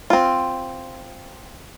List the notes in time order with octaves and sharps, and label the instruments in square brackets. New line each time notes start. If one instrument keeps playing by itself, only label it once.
[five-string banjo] C4 F4